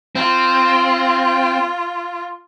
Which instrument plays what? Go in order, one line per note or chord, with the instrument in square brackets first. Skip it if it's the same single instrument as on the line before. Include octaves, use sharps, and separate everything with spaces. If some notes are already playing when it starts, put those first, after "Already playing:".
[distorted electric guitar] C4 [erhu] F4